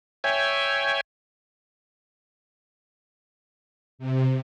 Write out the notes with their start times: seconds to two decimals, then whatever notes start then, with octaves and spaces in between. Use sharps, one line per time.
0.24 C#5 E5 G5 G#5
3.99 C3